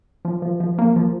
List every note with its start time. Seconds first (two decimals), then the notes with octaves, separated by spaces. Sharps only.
0.25 F3
0.42 F3
0.60 F3
0.78 A#3
0.96 F3